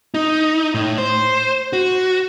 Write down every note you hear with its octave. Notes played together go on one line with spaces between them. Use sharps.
D#4
A2
C5
F#4